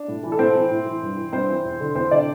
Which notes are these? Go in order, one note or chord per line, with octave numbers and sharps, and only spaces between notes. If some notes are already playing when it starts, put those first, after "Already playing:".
Already playing: D4
A2
E3
A4
A2 C4 C5
E3
A2
E3
G2
E3
G2 C4 C5
E3
E2
D3
E2 C4 C5
D3 D4 D5